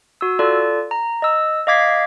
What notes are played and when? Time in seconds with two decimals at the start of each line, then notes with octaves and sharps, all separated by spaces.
0.21 F#4 E6
0.39 F4 A4 D5
0.91 A#5
1.22 D#5 E6
1.67 D#5 F5 D6 G#6 B6 C7